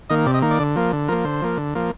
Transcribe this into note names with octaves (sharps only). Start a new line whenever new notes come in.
D#3 A#3 D#5
C3 D5
D#5
D#3 A#3
D5
D3
F3 A#3
D3
F3 A#3 A#4
D3 C5
F3 A#3
D3
F3 A#3